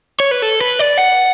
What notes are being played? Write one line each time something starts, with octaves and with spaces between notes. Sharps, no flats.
C#5
B4
A4
B4
D5
F#5